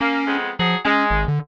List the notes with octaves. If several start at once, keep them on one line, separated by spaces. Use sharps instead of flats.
A#3 C#4
F2 G#3 B3
F3 F#3 F#4 G#4
G#3 C#4
G#1
D3